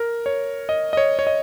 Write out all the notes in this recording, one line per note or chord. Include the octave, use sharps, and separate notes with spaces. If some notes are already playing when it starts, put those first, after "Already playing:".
Already playing: A#4
C#5
D#5
D#5
C#5
C#5
D#5